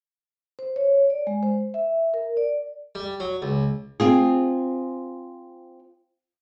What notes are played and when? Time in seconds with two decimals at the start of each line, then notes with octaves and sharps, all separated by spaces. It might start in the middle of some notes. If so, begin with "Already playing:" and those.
0.59 C5
0.76 C#5
1.10 D5
1.27 G#3
1.43 C5
1.74 E5
2.14 A#4
2.37 D5
2.95 G3
3.20 F#3
3.42 C#2
4.00 C4 F4 G#4